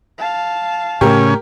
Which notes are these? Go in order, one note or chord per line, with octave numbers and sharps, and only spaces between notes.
F5 A5
A2 C#3 A3 C#4 G4 A#4